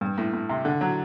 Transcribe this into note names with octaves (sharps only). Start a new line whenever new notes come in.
G2
A2
A2
C3
D3
F#3